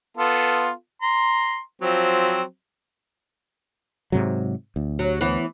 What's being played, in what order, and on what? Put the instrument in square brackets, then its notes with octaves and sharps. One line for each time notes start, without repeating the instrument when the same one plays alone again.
[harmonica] B3 F4 A4
A#5 C6
F3 F#3 C4
[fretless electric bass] G#2 C3 F#3
D2
[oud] F#3
E3 B3